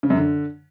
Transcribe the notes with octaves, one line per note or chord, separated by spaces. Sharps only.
C#3
F#2
D3